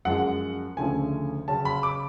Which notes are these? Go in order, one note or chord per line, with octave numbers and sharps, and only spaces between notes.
F#2 F3 G#3 F#5
D2 C#3 F3 A3 C#4 G#5
C#3 F#3 C#4 A5
B5
D6